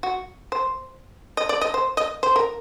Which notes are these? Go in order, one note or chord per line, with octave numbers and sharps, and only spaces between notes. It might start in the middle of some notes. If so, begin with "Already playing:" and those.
F#4
C5
D#5
D5
D#5
C5
D#5
C5
A#4